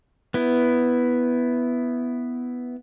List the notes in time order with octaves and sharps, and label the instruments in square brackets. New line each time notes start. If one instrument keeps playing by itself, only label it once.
[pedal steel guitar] B3 E4